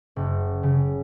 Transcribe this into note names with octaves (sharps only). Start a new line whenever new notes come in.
F#1
C#3